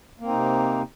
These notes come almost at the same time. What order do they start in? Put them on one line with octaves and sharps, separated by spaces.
A#3 C4 D#4 C3